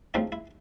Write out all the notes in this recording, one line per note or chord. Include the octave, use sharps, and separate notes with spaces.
C#3 F3 A3 C4 D#4 E4
E4